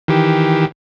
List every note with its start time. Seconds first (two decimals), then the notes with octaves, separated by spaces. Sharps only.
0.08 D#3 E3 G4